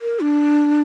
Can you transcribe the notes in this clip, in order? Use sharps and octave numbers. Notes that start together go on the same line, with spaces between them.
A#4
D4